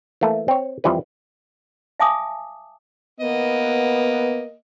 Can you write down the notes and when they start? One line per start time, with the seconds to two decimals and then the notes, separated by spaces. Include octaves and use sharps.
0.21 E3 A3 A#3
0.48 C4 C#5
0.84 F2 E3 F3 G3 B4
2.00 E5 F5 G#5 A5 D6 D#6
3.20 A#3 B3 D#5